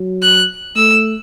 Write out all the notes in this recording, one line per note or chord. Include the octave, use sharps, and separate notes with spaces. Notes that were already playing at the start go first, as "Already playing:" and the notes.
Already playing: F#3
F#6
A3 E6